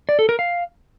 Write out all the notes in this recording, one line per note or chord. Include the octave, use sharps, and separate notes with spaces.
D5
A4
A#4
F5